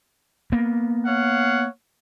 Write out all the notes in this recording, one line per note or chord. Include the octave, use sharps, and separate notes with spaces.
A#3 B3
C#5 F5 F#5